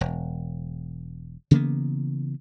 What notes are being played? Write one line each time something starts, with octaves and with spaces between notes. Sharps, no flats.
E1
C#3 E3 A#3 B3